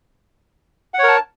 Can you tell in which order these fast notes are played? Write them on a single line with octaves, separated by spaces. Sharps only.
F#5 C#5 A#4 A5